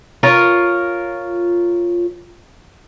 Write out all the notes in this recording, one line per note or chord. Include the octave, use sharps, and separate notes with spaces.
F4 A#4 C#5